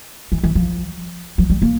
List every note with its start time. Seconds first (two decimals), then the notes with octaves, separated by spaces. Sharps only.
0.32 E3
0.44 E3
0.55 F3
1.38 F3
1.50 G3
1.62 A#3